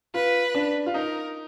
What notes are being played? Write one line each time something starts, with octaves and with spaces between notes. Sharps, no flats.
F4 B4
D4
F4
D#4 A#4